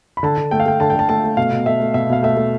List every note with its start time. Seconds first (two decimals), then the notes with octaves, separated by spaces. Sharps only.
0.17 B5
0.23 D3 A5
0.38 D3
0.51 A3 G5
0.60 F5
0.66 A3 G5
0.80 D3 A5
0.90 G5
0.95 D3 A5
1.09 A3 A5
1.24 A3
1.37 B2 F5
1.51 B2
1.66 A3 E5
1.80 A3
1.94 B2 E5
2.10 B2 F5
2.23 A3 E5
2.37 A3